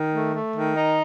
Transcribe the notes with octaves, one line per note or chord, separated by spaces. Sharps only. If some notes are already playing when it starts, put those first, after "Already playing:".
Already playing: D#3
A3
A3
D#3
D#4